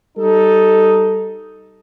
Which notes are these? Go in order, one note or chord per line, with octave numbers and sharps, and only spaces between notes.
G3 D#4 A4